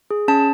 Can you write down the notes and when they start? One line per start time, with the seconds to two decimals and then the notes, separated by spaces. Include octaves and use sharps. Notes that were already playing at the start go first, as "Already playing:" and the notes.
0.11 G#4
0.28 C#4 A5